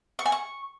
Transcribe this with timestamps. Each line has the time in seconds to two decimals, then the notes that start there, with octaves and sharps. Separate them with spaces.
0.19 C#6
0.26 G#5
0.32 C#6